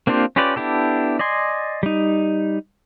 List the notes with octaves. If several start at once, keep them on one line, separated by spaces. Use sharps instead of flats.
A#3 C4 D4 F4 G4
C#4 F4 G4 B4 D5
B3 D4 E4 G4 A4
D5 D#5 G#5 C6
G3 D#4